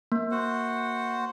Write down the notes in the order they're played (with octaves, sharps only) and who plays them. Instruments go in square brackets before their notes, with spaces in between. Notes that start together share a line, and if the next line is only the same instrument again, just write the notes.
[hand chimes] A#3
[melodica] F#4 C5 F#5